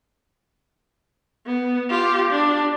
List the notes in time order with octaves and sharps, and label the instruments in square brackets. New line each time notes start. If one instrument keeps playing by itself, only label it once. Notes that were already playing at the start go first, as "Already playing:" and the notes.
[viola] B3
F4 G4
D4